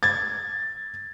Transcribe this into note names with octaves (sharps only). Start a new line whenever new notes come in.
G#6 A6